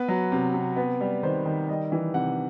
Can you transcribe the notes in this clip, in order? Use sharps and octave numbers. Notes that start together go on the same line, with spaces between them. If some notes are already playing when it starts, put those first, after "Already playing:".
Already playing: B3 B4
F#3
C3
C3
B3
G3
D#3 C5
D#3
G3 D#5
E3
C3 F#5